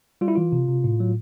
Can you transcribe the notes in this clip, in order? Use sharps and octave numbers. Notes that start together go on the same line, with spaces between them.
G3 F4
E4
E3 F4
C3
C3
A2
F#3